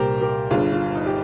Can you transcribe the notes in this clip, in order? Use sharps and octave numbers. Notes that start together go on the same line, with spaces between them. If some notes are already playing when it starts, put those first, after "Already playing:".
Already playing: C2 A#2 G3 G4 A#4 C5
G4 A#4
G1 G2 G3 F4 G#4
F4
D#4
G4